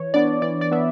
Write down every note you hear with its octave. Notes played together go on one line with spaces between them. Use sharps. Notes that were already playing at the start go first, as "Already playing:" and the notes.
Already playing: E3 C#5
B3 D4 D5
E3 D5
D5
B3 D4 E5